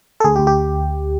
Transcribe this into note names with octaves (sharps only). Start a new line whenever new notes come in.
A4
D2 G#4
G4
D2
G4